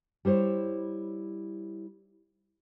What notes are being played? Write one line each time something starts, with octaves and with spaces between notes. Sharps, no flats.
G3 E4 C5 C#5